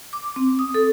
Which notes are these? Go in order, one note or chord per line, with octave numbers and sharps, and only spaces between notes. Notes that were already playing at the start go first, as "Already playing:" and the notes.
D6
C4
D#6
A4